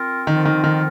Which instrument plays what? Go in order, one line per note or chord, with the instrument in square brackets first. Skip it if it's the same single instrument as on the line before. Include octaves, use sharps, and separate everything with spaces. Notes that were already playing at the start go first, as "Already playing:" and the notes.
Already playing: [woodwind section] C4 F4 A#4
[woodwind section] D3 F3 C4 F4 A#4 [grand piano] D#3
[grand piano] D#3
D#3